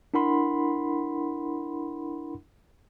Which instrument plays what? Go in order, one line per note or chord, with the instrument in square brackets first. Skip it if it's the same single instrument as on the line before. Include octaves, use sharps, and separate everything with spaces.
[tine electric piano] D4 E4 A#4 F#5 B5 C6